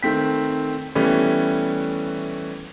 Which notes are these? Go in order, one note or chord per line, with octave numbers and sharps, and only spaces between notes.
D#3 A3 C4 B6
E3 G3 A3 B3 C#4